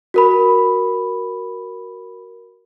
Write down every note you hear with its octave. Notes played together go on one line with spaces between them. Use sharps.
F#4 A#4 B5